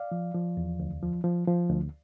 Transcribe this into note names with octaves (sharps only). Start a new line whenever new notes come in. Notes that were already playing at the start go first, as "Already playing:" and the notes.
Already playing: D5 F5
F3
F3
E2
D2
F3
F3
F3
D2